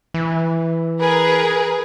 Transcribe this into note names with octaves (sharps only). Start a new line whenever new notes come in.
E3
G#4 A#4 B4